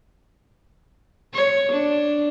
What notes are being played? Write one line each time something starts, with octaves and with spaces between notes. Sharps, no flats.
C#5
D4